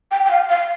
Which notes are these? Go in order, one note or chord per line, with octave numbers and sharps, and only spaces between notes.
G5
G5
F5
F5